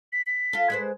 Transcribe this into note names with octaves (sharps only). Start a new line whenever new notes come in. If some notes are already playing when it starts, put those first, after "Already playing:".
B6
B6
F4 A4
G#3 B4 C5